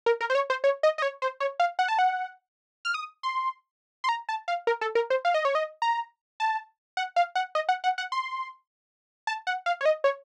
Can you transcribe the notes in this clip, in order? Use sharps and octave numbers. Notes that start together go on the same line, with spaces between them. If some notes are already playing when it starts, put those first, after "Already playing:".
A#4
A#4
C5
C#5
C5
C#5
D#5
D#5
C#5
C5
C#5
F5
F#5
A5
F#5
F6
D#6
C6
C6
A#5
A5
F5
A#4
A4
A#4
C5
F5
D#5
C#5
D#5
A#5
A5
F#5
F5
F#5
D#5
F#5
F#5
F#5
C6
A5
F#5
F5
C#5
D#5
C#5